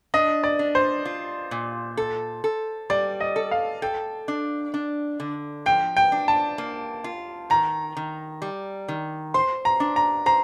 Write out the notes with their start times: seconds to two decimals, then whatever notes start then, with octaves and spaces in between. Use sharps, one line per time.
0.14 D4 D#5
0.44 D5
0.59 D4
0.75 C5
1.05 F4
1.51 A#2
1.97 A4
2.44 A4
2.90 G3 D5
3.20 D#5
3.36 A4
3.51 F5
3.82 A4 G5
4.28 D4
4.74 D4
5.20 D3
5.66 F3 G5
5.97 G5
6.12 D4
6.28 A5
6.58 A#3
7.04 F4
7.50 D#3 A#5
7.97 D#3
8.42 G3
8.88 D#3
9.34 C5 C6
9.65 A#5
9.80 D4
9.96 A#5
10.26 C5 A#5